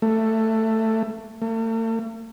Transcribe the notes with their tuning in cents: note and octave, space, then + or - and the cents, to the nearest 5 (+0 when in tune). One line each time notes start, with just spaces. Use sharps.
A3 +15
A3 +45